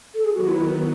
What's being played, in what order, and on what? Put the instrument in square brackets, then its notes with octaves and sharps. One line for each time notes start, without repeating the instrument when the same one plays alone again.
[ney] A4
G#4
[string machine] D#3 F#3 B3 [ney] F#4
[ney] E4